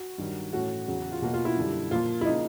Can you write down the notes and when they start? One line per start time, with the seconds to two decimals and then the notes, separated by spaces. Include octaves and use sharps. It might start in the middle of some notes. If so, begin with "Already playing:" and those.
Already playing: F#4
0.18 G2 D#3 F#3
0.52 A2 E3 A3 C#4 F#4
0.87 E2 C#3 F#3
1.12 F4
1.22 B2 F#3 A#3 F#4
1.34 F4
1.45 E4
1.57 F#2 D3 G3
1.91 A#2 F3 A#3 F4
2.21 E4
2.25 C#3 F3 A#3 D#4